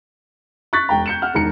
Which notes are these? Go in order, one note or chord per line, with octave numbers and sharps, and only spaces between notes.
C#6 F#6 A6 B6
E1 G5 A#5
G6 C#7 E7
F#5 F6
E1 D#3 A#5 C#7